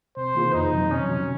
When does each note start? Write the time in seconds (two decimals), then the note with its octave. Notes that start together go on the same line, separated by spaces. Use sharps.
0.17 C3 C5
0.35 D#3 A#3 F4 G#4
0.53 F2 D#4
0.72 C3 D#3 F#3
0.91 C3 C#4
1.10 D#3 F#3